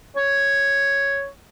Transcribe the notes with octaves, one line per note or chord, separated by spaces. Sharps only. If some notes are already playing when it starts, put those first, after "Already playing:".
C#5